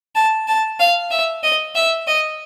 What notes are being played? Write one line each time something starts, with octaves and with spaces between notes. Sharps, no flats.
A5
A5
F5
E5
D#5
E5
D#5